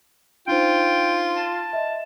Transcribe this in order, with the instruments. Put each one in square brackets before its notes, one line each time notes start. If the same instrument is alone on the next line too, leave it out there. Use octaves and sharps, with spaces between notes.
[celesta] D4 D#4 C5 [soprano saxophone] F4 [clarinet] G5
[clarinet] A5
[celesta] D#5 E5